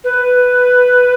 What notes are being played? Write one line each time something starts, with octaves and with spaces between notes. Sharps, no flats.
B4